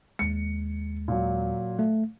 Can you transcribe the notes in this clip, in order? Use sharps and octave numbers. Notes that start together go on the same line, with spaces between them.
D#2 G#3 C#7
A#2 F#3
A3